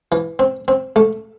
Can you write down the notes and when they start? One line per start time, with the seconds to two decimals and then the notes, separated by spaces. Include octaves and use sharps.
0.12 E3
0.39 C4
0.68 C4
0.96 A3